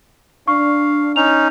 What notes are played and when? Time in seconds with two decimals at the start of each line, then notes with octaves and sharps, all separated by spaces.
0.48 D4 F5 C#6
1.16 C#4 D#4 F7